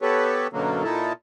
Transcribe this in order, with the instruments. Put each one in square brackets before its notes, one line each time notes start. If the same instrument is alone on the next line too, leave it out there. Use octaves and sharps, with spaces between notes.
[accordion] B3 G4 A4 B4 C#5
F#2 B2 D3 F#3 A#3
A#2 D#4 E4 A4